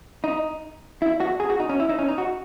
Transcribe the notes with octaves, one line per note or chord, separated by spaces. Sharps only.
D#4
E4
F#4
G#4
F#4
D#4
C#4
E4
D#4
C#4
D#4
F#4